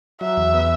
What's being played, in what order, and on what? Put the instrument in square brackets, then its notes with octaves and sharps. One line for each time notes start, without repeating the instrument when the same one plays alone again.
[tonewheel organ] F#3 [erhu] E5
[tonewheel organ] E2
B3